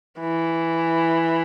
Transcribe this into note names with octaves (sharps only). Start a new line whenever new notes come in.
E3